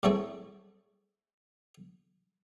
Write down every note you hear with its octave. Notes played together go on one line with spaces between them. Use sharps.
A2 F#3 A3 C4 G#4 C#5